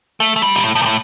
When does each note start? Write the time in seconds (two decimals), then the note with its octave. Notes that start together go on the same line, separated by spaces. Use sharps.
0.20 A3
0.36 A3
0.42 G3
0.56 A#2
0.64 A2
0.75 A2
0.82 A#2
0.86 A2